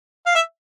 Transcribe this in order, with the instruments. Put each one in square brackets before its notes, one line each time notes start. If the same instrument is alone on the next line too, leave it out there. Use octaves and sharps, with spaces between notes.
[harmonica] F5
E5